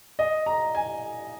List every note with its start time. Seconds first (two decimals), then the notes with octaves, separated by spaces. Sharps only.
0.19 D#5
0.46 A#5
0.75 G#5